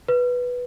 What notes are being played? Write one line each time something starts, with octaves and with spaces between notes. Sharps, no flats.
B4